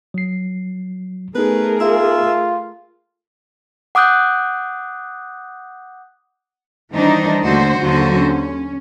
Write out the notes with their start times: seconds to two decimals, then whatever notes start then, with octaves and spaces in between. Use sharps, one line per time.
0.14 F#3 C7
1.35 A3 B3 D#4 G#4 A#4 B4
1.81 F4 E5
3.95 F#5 D6 D#6 F#6 G6
6.94 D#3 E3 G3 D4 D#4 C5
7.44 D#2 D3 A3 D4 F#4 C5
7.82 D#2 D3 F#3 A#3 F#4 C5
8.19 C#4